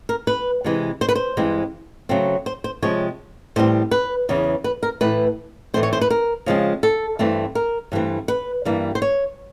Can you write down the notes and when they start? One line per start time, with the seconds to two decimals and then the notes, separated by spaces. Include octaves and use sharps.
0.09 A#4
0.27 B4
0.64 C3 E3 G#3
1.01 C5
1.09 B4
1.15 C5
1.37 G2 E3 G#3 C4
2.09 C#3 F#3 A3 C4
2.46 C5
2.64 C5
2.82 C3 F3 G#3 C4 C#5
3.56 A2 E3 G3 C4 C5
3.91 B4
4.29 E2 C#3 E3
4.64 B4
4.83 A#4
5.01 A2 E3 A3 B4
5.74 A2 E3 A3 C4 C5
5.83 C#5
5.93 C5
6.01 B4
6.10 A#4
6.46 C#3 F3 G#3 C4
6.83 A4
7.19 G2 E3 A3 C4
7.55 A#4
7.92 G2 E3 A3 C4
8.28 B4
8.65 G2 E3 G3 A#3
8.95 C5
9.02 C#5